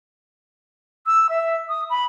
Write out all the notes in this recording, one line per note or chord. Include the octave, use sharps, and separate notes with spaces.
E6
E5
D#6
B5